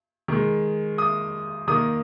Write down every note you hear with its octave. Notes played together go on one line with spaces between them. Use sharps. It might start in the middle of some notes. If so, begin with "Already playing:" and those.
D#3 G#3
D#6
D#3 A#3 D#6